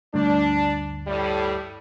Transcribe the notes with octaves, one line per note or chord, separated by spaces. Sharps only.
D2 G2 D4
A2 G3